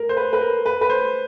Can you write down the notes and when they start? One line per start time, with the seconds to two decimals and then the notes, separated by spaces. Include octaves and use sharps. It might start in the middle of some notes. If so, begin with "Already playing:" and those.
Already playing: A#4
0.09 C5
0.17 B4
0.33 B4
0.41 A#4
0.66 B4
0.81 B4
0.90 C5